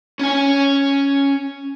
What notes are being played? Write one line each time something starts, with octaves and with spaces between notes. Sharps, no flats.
C#4 G#5